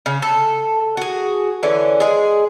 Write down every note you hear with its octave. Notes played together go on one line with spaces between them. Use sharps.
C#3
A4
F#4 G#4
D3 E3 C#4
G#3 G#4